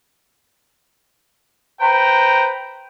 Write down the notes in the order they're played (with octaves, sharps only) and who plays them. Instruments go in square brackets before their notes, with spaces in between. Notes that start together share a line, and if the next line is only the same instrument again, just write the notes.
[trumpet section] B4 C5 G5 A#5